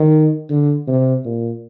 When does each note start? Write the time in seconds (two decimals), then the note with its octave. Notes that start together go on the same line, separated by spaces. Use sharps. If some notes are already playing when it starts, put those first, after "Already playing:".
Already playing: D#3
0.49 D3
0.88 C3
1.25 A#2